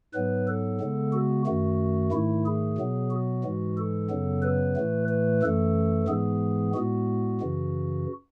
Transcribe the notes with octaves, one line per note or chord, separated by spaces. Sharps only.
G#2 F#3 B3 B4
A4
C#3 G#3 B3
F#4
F#2 D#3 A3 F#4
G#2 D#3 A3 E4
G#4
B2 F#3 B3
F#4
G#2 E3 G#3
A4
F#2 C#3 F#3 B3
B4
A2 E3 A3
B4
F#2 E3 A3 A4
G#2 E3 G#3 B3 G#4
A2 G#3 B3 F#4
F#2 C#3 E3